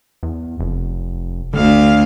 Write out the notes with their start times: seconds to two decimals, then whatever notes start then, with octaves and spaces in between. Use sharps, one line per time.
0.23 E2
0.60 F1
1.53 D2 D3 F5